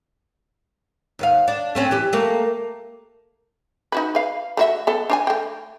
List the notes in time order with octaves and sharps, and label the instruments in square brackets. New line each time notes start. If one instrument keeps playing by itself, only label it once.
[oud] D#2 B3 F5
D4
A3 C4 C#4
E3 G4
A3 A#3
[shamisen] D#4 F#4 B4
B4 F5
A3 F#4 E5
B3 A4
D4 C#5 G#5
A3 G5